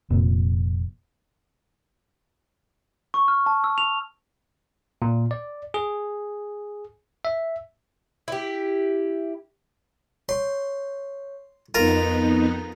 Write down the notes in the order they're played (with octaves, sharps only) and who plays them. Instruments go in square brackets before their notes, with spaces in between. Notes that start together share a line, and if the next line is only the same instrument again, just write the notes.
[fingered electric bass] F1 A#2
[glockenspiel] C#6
F6
A5
E6
F7
[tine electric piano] A#2
D5
G#4
E5
[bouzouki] E4 G4
[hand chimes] C#5 [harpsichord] C6
[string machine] F2 B3 D#4 [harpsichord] F4 A#4 [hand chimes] A#5